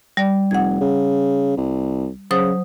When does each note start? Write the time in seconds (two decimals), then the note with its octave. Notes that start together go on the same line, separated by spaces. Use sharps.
0.17 G3 D5
0.51 F1 F#5 G#6
0.81 C#3
1.57 C2
2.31 C#3 F#3 C5 D#6